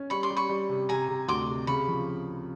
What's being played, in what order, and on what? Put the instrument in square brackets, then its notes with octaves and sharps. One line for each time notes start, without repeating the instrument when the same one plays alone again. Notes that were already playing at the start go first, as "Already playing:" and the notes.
Already playing: [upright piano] C#4
[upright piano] G3 [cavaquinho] B5 C#6
[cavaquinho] C6 D6
[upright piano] G3
[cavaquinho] B5 C#6
[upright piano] G3
C3
[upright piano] C3 [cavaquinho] G#5 A#5
[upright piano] C3
[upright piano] D2 [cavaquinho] C6 D6
[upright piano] C3
[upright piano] C#3 [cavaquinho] B5 C#6
[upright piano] F3